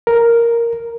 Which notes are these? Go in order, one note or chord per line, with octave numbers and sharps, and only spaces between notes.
A#4